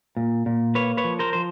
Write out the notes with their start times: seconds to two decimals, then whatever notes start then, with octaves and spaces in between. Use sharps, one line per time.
0.17 A#2
0.46 A#2
0.75 A#3 B4 C#5
0.97 B4 C#5
1.04 F3
1.19 A#4 C5
1.33 F3 C5